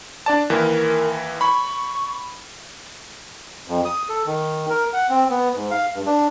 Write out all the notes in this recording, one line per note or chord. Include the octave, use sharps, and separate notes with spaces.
D4 D5 A5
D#2 E3 A#4
B5 C#6
F2
D#6
A4
D#3
A#4
F#5
C4
B3
G#2
F5
G2
D4